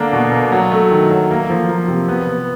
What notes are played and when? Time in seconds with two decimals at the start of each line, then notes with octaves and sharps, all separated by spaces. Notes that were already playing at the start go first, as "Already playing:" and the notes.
Already playing: D3 A#3 D4
0.13 B2
0.32 A#3
0.52 F#3
0.72 A3
0.91 D#3
1.11 F#3
1.31 A#3
1.50 F3
1.70 A#3
1.88 C3
2.09 B3
2.28 B3